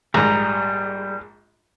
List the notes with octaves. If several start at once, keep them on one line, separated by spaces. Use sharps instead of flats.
A#1 G#2 G3 A#5